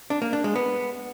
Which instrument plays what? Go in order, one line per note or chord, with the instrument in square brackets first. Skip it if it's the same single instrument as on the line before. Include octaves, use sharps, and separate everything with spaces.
[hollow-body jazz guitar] D4
A#3
D4
G#3
B3